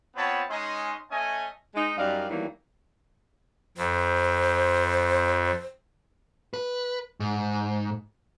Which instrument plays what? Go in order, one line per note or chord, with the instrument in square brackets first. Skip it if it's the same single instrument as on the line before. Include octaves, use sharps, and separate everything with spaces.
[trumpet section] B3 C4 F4 C#5 A5 B5
G#3 C#4 D#4 D#5 C6
A3 C#4 D#5 G#5
[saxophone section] G#3 D#4
F#2 G3 D#4 A#4 D5 F5
E2 D#3 E3 F#3 G3 A#3
[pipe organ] F2 [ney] C5
[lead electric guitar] B4
G#2